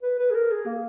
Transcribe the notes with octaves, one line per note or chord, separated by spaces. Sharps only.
B4
B4
G#4
A#4
G#4
A#3